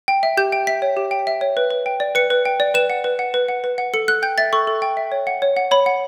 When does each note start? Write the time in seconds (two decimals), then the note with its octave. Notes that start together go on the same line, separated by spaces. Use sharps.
0.08 G5
0.23 E5
0.37 G4 G6
0.52 G5
0.67 E5 B6
0.82 C#5
0.97 G4
1.11 G5
1.27 E5
1.41 C#5
1.57 B4
1.71 B4
1.86 G5
2.00 D5
2.15 B4 C#7
2.30 B4
2.45 G5
2.60 D5
2.74 B4 E7
2.90 F#5
3.04 B4
3.19 F#5
3.34 B4
3.48 F#5
3.64 B4
3.78 F#5
3.94 A4 C#7
4.08 A4 F#6
4.22 G5 G6
4.38 E5 A6
4.53 A4 C#6
4.67 A4
4.82 G5
4.97 E5
5.12 C#5
5.27 F#5
5.42 C#5
5.56 F#5
5.71 C#5 B5
5.86 F#5